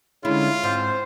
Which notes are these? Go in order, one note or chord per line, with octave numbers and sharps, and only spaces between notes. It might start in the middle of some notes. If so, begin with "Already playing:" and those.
D3 G#3 C#4 E4 F4
G#2 C4 C5